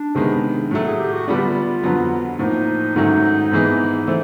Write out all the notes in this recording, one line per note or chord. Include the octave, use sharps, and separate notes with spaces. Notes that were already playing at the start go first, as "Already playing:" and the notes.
Already playing: D4
C3 D#3 G#3 B3
A2 F#3 A3
G#4
G4
F#4
D3 G3 B3 D4 F4
F2 D3 F#3 B3
A2 F3 A#3 D#4
G#2 D#3 F#3 A3 C#4
G#2 E3 G#3 B3
E3 A3 C4